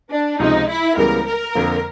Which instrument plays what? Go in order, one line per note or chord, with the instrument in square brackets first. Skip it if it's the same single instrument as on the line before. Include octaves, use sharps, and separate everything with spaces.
[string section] D4
[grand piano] C#2 C3 F3 [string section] D#4
[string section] E4
[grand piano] C#2 C#3 E3 G3 B3 [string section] A#4
[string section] A#4
[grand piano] F2 D3 F3 A#3